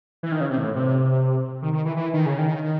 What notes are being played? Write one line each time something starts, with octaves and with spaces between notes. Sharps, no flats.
E3
D#3
C#3
C3
A2
C3
D#3
D#3
E3
E3
D#3
C#3
D#3